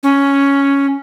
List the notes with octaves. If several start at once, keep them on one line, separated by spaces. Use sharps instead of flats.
C#4